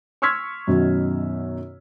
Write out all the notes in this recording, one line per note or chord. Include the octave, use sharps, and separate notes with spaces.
C6 C#6 E6 F6 G#6 B6
F#2 B2 D#3 F#3